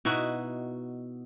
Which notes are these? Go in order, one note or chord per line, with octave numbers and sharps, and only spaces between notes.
B2 D#4 E4 F#4